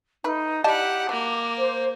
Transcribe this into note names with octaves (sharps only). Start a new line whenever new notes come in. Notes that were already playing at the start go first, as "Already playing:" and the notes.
A3 D#4 B4
E4 G4 D5 D#5 F#5 A5
F#3 A#3 D6
C5